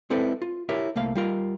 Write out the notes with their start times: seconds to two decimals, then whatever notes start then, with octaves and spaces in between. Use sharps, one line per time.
0.10 G#3 C4 E4 A4 B4 D5
0.42 F4
0.69 E4 G4 A#4 C#5 E5
0.96 C2 A3 A#3 F5
1.15 G3 F4 A#4